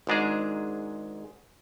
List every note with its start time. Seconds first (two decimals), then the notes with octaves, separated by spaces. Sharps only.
0.07 G#1 G#2 G#3 D4 G#4